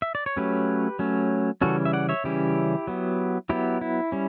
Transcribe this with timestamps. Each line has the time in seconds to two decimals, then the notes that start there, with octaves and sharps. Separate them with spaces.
0.02 E5
0.15 D5
0.26 C#5
0.37 F#3 A3 C#4 G4 B4
0.99 F#3 A3 C#4
1.61 C#3 E3 G3 C#4 F#4 A4
1.85 E5
1.93 D5 F#5
2.09 C#5 E5
2.24 C#3 E3 G3 C#4 E4 G4
2.87 F#3 B3
3.49 F#3 B3 E4 G4
3.81 E4
4.12 G3 C#4